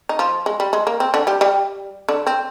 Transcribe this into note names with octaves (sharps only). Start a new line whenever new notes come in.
D#4
F3 F4
G#3
G3
G#3
A#3
C4
D3 D4
G3 G4
G3 G4
D3 D4
C4